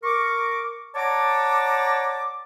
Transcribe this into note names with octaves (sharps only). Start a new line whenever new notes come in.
A#4 C#6 D6
C#5 D5 F#5 A5 A#5 D6